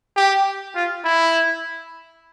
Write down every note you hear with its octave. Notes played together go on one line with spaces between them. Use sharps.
G4
F4
E4